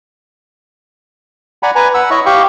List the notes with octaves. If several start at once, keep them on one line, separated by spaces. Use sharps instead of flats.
D5 F#5 G#5 A#5 B5
B4 G#5 A#5
F#5 B5 E6
E4 C#5 D#5 E5 C#6
G4 F5 G5 C#6